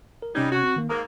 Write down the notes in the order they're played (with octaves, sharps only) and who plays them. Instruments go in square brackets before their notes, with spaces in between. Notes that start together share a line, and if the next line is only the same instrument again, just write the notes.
[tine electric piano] A#4
[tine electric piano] C3 C#4 G#6 [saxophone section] G3 D#4
[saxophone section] F#4
[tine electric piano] C4
D#3 A#3
[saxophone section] G#2 G#3 A#3 [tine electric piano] A#5